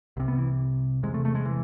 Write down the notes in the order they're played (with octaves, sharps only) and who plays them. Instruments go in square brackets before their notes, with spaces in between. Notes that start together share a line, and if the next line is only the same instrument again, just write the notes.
[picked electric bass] C2 C3
B3
E3
E2 C3 G#3
A3
A3
G#3
E3